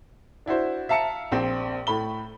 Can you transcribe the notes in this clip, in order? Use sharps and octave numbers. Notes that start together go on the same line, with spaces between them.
D4 E4 F#4 C5
E5 F5 A5 A#5 C#7
A#1 C4
A2 A3 B5 G7